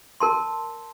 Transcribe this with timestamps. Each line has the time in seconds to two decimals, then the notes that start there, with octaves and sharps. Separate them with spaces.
0.20 A#4 A5 C6